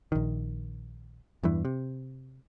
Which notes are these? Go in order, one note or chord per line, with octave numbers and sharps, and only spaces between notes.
A#1 D#3
E2 G2 E3
C3